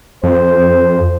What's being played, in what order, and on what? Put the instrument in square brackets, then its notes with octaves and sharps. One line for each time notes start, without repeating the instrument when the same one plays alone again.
[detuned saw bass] F2 [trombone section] C5